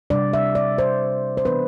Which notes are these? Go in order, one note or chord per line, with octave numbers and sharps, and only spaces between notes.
C3 G3 D4 D5
E5
D5
C5
C5
E3 B3 D4 B4